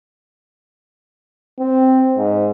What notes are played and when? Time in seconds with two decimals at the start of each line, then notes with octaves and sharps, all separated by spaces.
1.59 C4
2.17 G#2